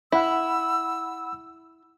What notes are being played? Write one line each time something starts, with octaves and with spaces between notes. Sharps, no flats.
E4 F#5 B5 E6